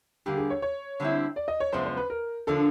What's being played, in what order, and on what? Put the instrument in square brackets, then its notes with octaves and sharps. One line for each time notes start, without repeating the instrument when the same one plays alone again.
[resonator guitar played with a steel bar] D3 G3 A#3 [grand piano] G4
[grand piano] G#4
C#5
C#5
[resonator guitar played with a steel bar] D3 G3 C4 E4
[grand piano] D5
D#5
C#5
[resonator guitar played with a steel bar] F#2 C#3 F3 G#3 B3 [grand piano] C5
[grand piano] C5
B4
A#4
[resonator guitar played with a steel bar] D3 F3 A#3 D4 [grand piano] A4